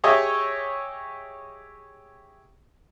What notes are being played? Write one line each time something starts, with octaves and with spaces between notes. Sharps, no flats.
G4 G#4 C#5 D#5 E5